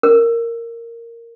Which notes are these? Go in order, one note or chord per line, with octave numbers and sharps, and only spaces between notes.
A#4